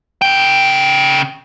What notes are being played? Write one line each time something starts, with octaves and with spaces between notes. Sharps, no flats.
C#3 G5